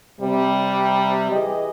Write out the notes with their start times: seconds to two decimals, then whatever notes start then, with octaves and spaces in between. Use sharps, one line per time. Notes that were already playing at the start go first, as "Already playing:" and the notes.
0.20 C3 G3
1.31 E3 G4 G#4 D#5